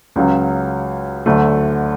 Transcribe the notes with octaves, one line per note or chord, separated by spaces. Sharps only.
C#2 C#3 F#3
D2 D3 F#3 A3